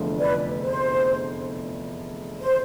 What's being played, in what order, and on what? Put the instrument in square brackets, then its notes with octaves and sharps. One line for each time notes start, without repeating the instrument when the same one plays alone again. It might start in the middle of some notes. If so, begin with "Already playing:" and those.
Already playing: [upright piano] F1 E2 D3 F3 A3
[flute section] B4 D5
C5
C5